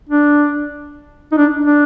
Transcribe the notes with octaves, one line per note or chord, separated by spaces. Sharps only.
D4
D#4
D4
D4